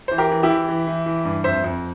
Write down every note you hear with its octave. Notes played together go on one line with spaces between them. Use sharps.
E3 C5
G4 A#4
E3
E4 G4
E3
E3
E3
E3
G2
F2 C5 E5
F2